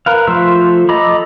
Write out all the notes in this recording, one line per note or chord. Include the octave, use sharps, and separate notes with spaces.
A#4 B4 F5
F3 A3 C5 E5
A4 D#5 A#5 B5 D6